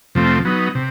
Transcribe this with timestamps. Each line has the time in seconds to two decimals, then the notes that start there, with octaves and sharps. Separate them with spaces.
0.15 F2 C3 F3 A3 C4
0.45 F#3 B3 D#4
0.75 C3